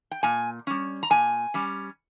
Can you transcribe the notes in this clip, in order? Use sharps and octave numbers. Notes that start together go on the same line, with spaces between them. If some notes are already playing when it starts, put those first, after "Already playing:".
G5
A#2 G#5
G3 C#4
A#5
A#2 G#5
G3 C#4